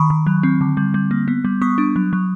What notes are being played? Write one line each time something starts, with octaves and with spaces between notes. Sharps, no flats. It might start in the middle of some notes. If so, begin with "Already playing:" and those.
Already playing: D#3 B5 C#6
D#3
F#3
C4
D3
G3
G3
A#3
B3
G3
B3 C#6 D#6
D4
F#3
F#3